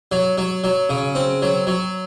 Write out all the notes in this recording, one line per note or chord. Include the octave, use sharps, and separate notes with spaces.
F#3
F#3
F#3
C#3
C4
F#3
F#3